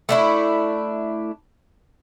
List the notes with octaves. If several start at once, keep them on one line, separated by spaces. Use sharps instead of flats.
A3 D4 E4